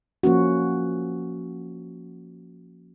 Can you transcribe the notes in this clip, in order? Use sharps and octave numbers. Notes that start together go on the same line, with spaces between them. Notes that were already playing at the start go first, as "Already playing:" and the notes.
F3 A#3 C#4 F#4